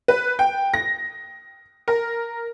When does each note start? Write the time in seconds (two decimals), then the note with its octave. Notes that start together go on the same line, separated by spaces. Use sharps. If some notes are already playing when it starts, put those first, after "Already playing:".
0.08 B4
0.39 G5
0.74 A#6
1.88 A#4